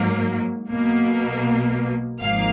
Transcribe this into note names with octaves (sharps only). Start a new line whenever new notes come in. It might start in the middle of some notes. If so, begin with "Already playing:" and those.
Already playing: G#2 F#3 A#3
B1 B2 A#3
G#1 G#2 F3 A#3 F5